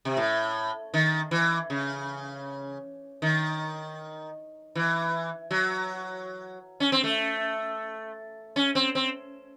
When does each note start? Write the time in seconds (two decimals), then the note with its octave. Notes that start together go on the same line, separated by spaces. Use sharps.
0.05 C3
0.17 A2
0.94 D#3
1.31 E3
1.70 C#3
3.22 D#3
4.75 E3
5.51 F#3
6.80 C#4
6.92 C4
7.04 A3
8.56 C#4
8.75 C4
8.95 C4